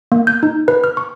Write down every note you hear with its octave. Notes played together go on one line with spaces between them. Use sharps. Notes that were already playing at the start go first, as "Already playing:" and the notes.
A#3
G6
D#4
B4
F6
C#6